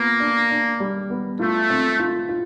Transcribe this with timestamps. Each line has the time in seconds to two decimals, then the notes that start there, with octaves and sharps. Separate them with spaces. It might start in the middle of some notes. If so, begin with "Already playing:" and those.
Already playing: A#3 B3 F4
0.20 D4
0.50 D4
0.80 G3
1.10 B3
1.39 A3 F4
1.70 C4
1.99 F4
2.29 F4